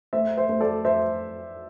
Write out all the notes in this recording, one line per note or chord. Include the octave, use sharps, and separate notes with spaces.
A3 C5 E5
C5 E5
A3
A4 D5
C5 E5